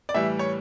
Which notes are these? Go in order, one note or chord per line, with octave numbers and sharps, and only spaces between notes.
D5
A2 E3 G3 E5
C#5